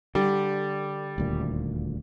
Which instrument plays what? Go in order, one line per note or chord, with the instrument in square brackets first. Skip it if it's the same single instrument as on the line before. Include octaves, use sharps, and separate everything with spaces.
[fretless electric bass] D3 [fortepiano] G3 G4
[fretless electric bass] D#1 D2 A#2